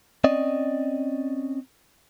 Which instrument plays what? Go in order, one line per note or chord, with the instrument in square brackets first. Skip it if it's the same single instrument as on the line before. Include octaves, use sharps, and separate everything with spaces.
[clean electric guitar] C4 C#4 D5 D#5